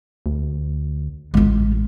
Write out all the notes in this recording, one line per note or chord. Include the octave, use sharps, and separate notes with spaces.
D2
A1 G#3 F4